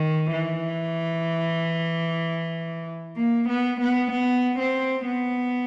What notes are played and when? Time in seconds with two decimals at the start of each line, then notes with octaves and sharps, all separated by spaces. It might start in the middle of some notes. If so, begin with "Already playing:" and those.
Already playing: D#3
0.32 E3
3.16 A#3
3.48 B3
3.80 B3
4.11 B3
4.58 C4
5.06 B3